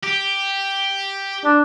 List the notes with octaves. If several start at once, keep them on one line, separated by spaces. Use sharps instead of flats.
G4
D4